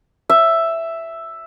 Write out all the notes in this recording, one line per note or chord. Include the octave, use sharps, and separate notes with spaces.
E5